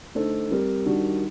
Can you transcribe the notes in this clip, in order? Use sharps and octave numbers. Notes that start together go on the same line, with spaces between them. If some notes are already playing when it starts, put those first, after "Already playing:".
D3 A3 D#4 A4 C5
G3 C4 G4 A#4
D#3 G3 D4 F#4